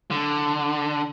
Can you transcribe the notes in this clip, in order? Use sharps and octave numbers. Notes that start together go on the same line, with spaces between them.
D3